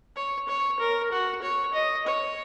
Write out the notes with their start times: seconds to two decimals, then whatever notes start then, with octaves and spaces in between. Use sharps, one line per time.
0.16 C#5
0.48 C#5
0.80 A#4
1.11 F#4
1.42 C#5
1.73 D#5
2.06 C#5